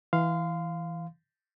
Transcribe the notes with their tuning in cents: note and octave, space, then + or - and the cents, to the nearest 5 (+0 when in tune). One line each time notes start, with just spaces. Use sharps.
E3 +0 F5 +0 C6 -30